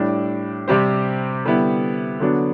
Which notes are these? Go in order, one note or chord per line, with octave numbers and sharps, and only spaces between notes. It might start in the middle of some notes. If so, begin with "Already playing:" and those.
Already playing: A2 G3 D4
C3 G3 C4 G4 C5
D3 G3 B3 E4
D3 F#3 B3 D4